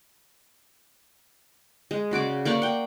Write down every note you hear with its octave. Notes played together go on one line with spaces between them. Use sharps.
G#3
C#3 F#4 D5 D6
A#3 D5 F#5 C#6
F#5 G5